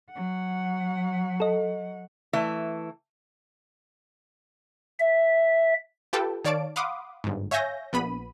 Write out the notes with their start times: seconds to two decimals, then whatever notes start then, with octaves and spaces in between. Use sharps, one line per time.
0.11 F#3 F#5
1.40 A4 D#5
2.33 E3 A3 E5
5.00 E5
6.13 F4 G4 A4 B4 G5 A5
6.44 D#3 C#5 D5 F5 A5 D7
6.76 F5 F#5 B5 C6 D6 D#6
7.24 G1 G#2
7.51 C#5 E5 F5 G#5 G6 A#6
7.93 A#1 B3 B5 D#7